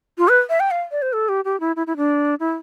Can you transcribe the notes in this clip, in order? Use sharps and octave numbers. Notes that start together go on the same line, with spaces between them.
F4
B4
E5
G5
F5
D5
C5
A4
G4
G4
E4
E4
E4
D4
E4